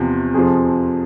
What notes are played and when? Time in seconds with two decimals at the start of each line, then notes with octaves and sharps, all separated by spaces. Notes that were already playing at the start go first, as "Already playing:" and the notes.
Already playing: E2 C3 F3
0.34 F2 C3 F3 G#4